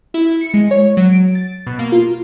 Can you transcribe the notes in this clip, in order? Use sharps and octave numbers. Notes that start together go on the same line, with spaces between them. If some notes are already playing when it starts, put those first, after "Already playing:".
E4
C#7
G#3
C#5
F#3
D7
A6
B2
A#3
F4